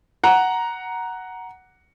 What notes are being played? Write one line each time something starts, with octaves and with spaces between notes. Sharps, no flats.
F#5 A#5